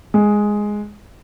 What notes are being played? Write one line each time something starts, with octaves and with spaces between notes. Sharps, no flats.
G#3